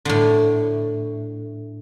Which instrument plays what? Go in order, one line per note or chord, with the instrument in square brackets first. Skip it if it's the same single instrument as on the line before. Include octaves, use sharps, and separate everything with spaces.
[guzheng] A2 D3